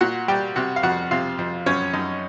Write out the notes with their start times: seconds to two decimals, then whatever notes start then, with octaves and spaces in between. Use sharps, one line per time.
0.01 A#2 F#4 F#5
0.28 G3 G4 G5
0.56 C3 F#4 F#5
0.76 F5
0.83 F2 F#4 F#5
1.11 C3 F4 F5
1.39 F2
1.66 F#2 C#4 C#5
1.93 F#2 D#4 D#5